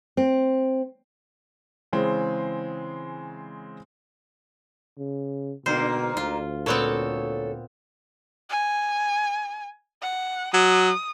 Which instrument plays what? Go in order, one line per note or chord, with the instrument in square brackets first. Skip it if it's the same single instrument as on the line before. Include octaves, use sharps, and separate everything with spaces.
[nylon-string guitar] C4
[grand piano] C#3 E3 G#3 C4
[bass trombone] C#3
[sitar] G#2 D3 A#3 [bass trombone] B2 [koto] C5
[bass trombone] D2 [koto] F4
[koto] A#2 B3 C4 [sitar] A4 C#5
[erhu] G#5
F#5
[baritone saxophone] F#3 [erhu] D#6